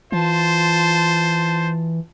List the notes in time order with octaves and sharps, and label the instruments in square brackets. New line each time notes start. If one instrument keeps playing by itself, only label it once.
[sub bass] E3 [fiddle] F4 A5 [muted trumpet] C5